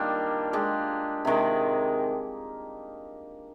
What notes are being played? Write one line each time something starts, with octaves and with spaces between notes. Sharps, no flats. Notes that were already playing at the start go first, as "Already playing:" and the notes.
Already playing: D#3 G3 A#3 D4 F4
G#3 D4 G4
C3 D#3 G#3